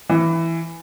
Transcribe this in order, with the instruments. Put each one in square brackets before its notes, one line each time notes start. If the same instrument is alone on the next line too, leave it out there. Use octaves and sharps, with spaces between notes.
[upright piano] E3